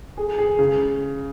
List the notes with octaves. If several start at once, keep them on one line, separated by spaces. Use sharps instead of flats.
G#4
G#4
C#3